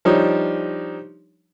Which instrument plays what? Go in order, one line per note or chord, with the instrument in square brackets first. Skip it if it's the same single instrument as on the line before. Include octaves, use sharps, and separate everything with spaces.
[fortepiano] F3 G3 D4 D#4 C#5